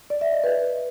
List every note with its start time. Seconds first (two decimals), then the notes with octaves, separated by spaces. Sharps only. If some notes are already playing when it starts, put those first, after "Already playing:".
0.10 D5
0.21 E5
0.33 D#5
0.44 B4